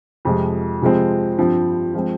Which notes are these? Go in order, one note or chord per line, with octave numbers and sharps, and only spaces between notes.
F2 C3 F3 G#3
C3 F3 G#3 C4
G2 F3 C4
F3 G#3 C4